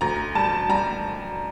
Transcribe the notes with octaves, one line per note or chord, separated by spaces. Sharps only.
D2 A#5
G3 A5
G3 A#5